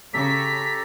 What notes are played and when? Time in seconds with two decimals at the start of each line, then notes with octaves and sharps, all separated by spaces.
0.14 C#3 G4 A4 A#5 B6